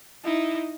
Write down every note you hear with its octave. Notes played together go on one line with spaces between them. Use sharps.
D#4 E4